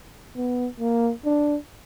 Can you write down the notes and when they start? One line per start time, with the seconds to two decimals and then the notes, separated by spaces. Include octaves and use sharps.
0.36 B3
0.80 A#3
1.25 D4